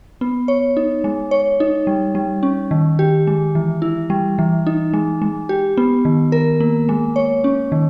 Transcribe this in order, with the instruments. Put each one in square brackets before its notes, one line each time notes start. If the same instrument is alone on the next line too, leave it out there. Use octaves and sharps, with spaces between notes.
[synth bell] B3
C#5
D#4
G#3
C#5
D#4
G3
G3
C#4
D#3
G4
G#3
E3
E4
G3
E3
D#4
G#3
G#3
G4
B3
D#3
A#4
A#3
G#3
C#5
C#4
D#3